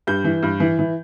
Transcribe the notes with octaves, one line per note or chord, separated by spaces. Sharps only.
G2 G6
E3
G2
E3
E3